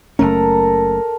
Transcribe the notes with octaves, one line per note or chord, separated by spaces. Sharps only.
F#1 A3 C#4 A4 A#4